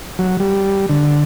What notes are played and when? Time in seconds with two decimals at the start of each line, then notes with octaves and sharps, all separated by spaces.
0.19 F#3
0.40 G3
0.89 D3